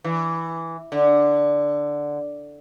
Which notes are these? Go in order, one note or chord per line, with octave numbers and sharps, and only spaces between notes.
E3
D3